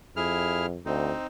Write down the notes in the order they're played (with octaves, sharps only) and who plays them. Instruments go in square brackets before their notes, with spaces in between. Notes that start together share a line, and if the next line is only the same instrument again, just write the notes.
[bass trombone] F2 [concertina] E4 G#4 F6
[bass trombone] D2 [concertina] C4 D#4